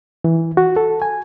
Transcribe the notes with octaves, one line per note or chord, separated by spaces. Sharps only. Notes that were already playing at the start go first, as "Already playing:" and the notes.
E3
F#4
A4
G#5